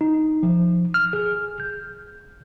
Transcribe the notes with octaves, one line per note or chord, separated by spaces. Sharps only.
D#4
F3
F6
G#4
G6